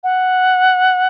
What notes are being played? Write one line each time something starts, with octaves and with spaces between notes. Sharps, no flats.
F#5